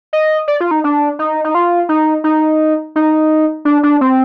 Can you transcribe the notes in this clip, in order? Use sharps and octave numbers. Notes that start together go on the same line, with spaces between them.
D#5
D5
F4
D#4
D4
D#4
D#4
F4
D#4
D#4
D#4
D4
D4
C4